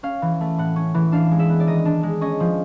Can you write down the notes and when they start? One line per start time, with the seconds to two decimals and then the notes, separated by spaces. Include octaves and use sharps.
0.03 C#4 F5
0.22 E3
0.40 A3
0.58 A2 F#5
0.76 C#4
0.94 E3
1.12 D4 F5
1.31 G#3
1.39 E5
1.50 B3
1.60 D5
1.68 D#3 D#5
1.85 D4
2.03 G#3
2.21 C#4 D#5
2.40 F3